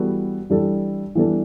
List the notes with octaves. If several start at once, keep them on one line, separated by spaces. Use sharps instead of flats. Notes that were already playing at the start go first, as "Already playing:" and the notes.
Already playing: E3 G3 B3 F#4 A4
E3 G3 D4 A4
E3 G3 B3 D4 A4